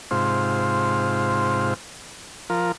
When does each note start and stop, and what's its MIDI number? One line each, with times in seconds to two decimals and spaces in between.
0.11 1.74 44
0.11 1.74 48
0.11 1.74 65
0.11 1.74 72
2.50 2.72 53
2.50 2.72 65
2.50 2.72 70